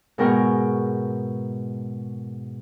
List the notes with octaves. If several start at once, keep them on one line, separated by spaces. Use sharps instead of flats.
G#2 B2 A#4 G5 C#6